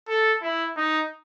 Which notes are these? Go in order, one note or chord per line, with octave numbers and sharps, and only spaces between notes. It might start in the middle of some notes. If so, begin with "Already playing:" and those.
A4
E4
D#4